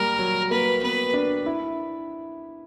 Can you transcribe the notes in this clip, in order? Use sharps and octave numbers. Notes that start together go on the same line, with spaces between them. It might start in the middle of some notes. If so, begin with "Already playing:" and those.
Already playing: G3 A#3 A#4
F#3
A#3 B4
B3 B4
D4
E4